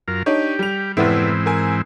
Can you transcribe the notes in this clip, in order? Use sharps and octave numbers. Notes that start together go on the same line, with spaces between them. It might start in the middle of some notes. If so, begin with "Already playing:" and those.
F#2 F4 A#4
D4 D#4 G4 C#5
G3 F7
F1 G#2 E3 B3 C4 E4
A#4 G#5